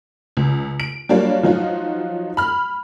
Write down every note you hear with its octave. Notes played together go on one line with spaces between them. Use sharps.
C#2
D7
F#3 G3 A#3 D4 F4 C#5
F3 F#3 D#4 F4 F#4
B5 F6